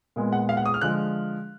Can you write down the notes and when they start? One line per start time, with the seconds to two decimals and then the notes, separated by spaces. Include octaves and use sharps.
0.16 A#2 G#3 B3
0.32 F#5
0.49 F5
0.57 F#5
0.66 D#6
0.74 F6
0.81 D3 F3 G#3 F#6